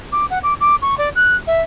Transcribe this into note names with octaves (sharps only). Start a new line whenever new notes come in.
D6
F#5
D6
D6
C#6
D5
F#6
E5